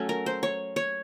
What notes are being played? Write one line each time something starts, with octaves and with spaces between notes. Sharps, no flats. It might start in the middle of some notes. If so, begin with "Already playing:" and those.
Already playing: F#3 A3 C#4
A#4
C5
C#5
C#5